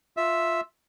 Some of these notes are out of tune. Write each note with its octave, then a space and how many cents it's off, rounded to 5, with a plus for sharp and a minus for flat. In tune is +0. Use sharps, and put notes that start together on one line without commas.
F4 +0 E5 +0